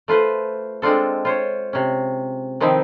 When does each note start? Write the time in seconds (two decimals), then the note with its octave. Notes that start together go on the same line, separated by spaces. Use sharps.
0.08 A3 F4 B4 C5
0.82 G#3 C4 D4 F4 A4
1.25 F4 C5 C#5
1.73 C3 C#4
2.60 D#3 F3 C4 D#4 E4